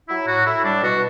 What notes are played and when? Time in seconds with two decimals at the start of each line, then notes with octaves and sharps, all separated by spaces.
0.08 F#3 E4
0.27 A2 F#4
0.46 A2 E4
0.64 G3 D4
0.83 B2 F#4